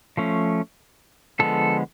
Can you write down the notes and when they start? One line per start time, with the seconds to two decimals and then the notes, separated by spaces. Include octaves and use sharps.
0.17 F3 A3 C#4
1.39 D3 F3 G#3 B3 A4